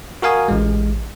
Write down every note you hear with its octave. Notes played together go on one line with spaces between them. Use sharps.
F#4 A#4 F5 G#5 D#6
A1 G#3